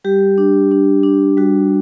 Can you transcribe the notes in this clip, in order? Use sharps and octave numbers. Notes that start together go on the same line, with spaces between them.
G3 G4
D4
D4
D4
G3 F#4